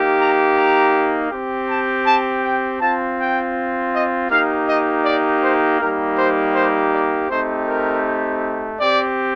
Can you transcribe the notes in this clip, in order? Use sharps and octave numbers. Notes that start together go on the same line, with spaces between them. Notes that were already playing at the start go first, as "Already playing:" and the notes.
Already playing: A#3 D#4 G4
A#5
A#5
C4 G4
A5
A5
G5
C4 F4 A5
G5
D#5
A#3 D#4 G4 F5
D#5
D5
C5
G3 A#3 D#4 G4 A#4
C5
C5
D5
A3 C4 D#4 G4 C5
A#4
C4 G4 D5